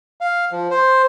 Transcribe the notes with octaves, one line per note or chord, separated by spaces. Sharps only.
F5
F3
C5